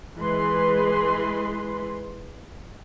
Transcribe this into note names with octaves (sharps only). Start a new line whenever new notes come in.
E3 G#3 B4 C6